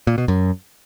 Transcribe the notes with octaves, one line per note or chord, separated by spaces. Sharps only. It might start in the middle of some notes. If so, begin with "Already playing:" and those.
A#2
B2
F#2